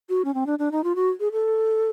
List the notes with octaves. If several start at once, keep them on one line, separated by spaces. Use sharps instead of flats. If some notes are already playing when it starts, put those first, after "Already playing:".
F#4
C#4
C4
D4
D4
D#4
F4
F#4
G#4
A4